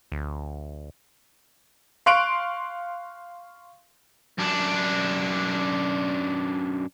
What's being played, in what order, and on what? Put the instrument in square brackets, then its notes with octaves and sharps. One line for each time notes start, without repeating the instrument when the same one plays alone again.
[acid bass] D2
[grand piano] F5 C6 C#6 F#6 D7 F7
[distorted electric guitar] F#2 D4